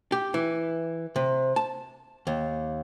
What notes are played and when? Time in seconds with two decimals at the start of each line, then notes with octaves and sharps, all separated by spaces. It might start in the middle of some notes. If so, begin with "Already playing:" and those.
0.12 G4
0.34 E3
1.16 C3
1.56 A5
2.27 D#2